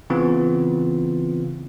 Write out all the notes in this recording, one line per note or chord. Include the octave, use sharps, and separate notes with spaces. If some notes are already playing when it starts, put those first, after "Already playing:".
C#3 E3 B3 C4 F4